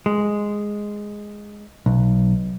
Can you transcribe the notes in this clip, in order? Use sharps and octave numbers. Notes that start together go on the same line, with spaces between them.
G#3
B1